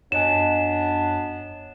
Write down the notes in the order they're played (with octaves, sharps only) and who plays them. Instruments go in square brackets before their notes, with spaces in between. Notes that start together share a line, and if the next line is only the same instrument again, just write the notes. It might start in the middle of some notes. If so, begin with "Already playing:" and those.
[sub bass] F#2 [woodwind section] F#3 B3 D4 [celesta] C#5 D#5 G#5 [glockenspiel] E7